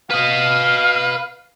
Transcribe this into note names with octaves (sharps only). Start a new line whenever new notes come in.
B4 D#5 F5